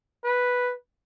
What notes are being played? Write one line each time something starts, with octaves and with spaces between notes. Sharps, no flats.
B4